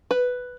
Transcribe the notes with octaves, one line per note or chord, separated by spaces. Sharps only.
B4